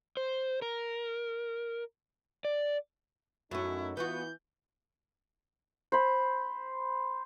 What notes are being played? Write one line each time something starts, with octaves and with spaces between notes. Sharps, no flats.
C5
A#4
D5
F#2 A3 C#4 D#4 E4 F#4
E3 B3 F4 F#4 G6
C5 B5